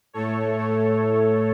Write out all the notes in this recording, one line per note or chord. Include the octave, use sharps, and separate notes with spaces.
A2 A3 A4 C#5
A2 A3